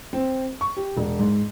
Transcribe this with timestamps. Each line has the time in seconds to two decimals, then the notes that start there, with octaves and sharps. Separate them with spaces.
0.13 C4
0.61 C#6
0.77 G4
0.97 E1
1.19 G#2